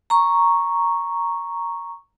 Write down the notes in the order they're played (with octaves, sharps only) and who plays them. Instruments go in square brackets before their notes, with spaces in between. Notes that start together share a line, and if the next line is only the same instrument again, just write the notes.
[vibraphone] A#5 C#6